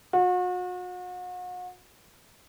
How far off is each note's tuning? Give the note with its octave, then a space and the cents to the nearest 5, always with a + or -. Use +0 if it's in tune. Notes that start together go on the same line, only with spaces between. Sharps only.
F#4 -40